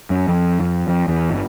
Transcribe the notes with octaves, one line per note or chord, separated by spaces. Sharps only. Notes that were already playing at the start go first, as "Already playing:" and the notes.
F#2
F2
F2
F2
E2
G1